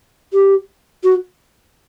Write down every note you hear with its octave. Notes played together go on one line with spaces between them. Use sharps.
G4
F#4